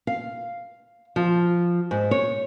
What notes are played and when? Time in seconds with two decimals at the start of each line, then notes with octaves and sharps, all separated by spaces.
0.07 F5
1.16 F3
1.91 G#2
2.11 C#5